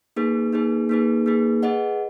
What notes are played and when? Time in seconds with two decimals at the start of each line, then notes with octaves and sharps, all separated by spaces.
0.16 A#3 D#4 G#4 B4
0.53 A#3 D#4 G#4 B4
0.89 A#3 D#4 G#4 B4
1.26 A#3 D#4 G#4 B4
1.63 G#4 B4 D#5 F#5